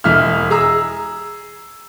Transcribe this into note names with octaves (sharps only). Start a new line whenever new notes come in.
E1 E3 E5 F6
G#4 A#5 E6